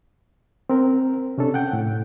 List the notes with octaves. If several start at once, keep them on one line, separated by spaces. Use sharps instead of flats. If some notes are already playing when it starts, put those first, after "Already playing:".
C4 A#4
C3 C#4 D4 A4
F#5 G5
A2